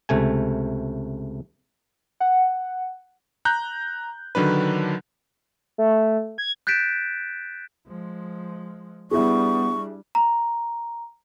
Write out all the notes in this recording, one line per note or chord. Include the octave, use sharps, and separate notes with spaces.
C#2 C3 A3 G#5
F#5
A#5 F#6 G6
D3 D#3 F#3 D4 B4
A3
G#6
F#6 G6 A6 B6 D7 E7
F3 G#3
G3 B3 D4 E4 G#4 C#6
A#5